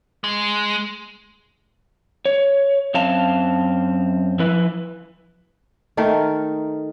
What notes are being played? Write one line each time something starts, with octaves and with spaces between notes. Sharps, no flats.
G#3
C#5
F#2 C4 F5 A5
F3 E4 B4
D#3 A3 D#4 A#4